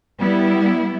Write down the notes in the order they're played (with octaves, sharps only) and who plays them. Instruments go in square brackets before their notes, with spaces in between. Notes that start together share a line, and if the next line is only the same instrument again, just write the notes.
[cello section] G3 B3 E4